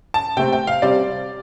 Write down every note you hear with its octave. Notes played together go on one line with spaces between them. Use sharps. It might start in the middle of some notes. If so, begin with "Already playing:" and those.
A5
C3 A3 C4 G5
G5
F5
C3 G3 C4 D5